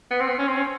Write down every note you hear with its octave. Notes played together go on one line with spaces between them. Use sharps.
B3
C4
B3
C#4
C4
C#4